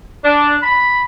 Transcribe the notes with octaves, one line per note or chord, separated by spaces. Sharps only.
D4
B5